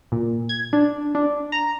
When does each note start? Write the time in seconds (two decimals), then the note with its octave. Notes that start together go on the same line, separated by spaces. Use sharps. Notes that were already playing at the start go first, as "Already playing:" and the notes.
0.12 A#2
0.49 G#6
0.73 D4
1.15 D4
1.52 A#5